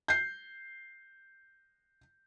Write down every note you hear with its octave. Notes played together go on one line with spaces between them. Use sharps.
G6 C7